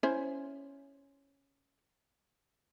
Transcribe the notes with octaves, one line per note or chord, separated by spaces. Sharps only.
C#4 E4 C5